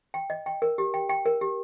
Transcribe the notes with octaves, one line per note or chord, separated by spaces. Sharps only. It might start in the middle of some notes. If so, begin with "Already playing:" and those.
G5
D#5
G5
A#4
G4
G5
G5
A#4
G4